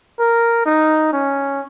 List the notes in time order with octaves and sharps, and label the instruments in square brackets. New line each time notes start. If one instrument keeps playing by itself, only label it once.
[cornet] A#4
D#4
C#4